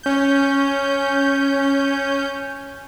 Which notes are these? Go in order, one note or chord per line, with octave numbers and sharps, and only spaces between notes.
C#4 G6